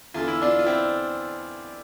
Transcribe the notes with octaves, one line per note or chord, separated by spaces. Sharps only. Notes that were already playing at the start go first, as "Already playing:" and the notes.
E2 D3 F4
E4
D4 F4
F4
C4 E4